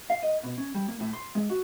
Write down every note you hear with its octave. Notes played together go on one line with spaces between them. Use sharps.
F5
D#5
B2
C#4
G3
A#3
A2
C6
G#3
F#4